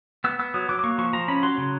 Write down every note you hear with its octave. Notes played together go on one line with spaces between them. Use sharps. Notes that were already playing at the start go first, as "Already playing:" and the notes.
B3 E6
B3 E6
F#3 D#6
F#3 D6
D6
A#3 C#6
F3 C#6
F3 A#5
C#4 B5
F#3 C6
C#3